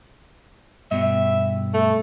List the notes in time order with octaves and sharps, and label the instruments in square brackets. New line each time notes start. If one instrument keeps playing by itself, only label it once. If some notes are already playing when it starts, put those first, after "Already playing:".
[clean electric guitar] G2 B2 [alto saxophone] E5
[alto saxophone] A3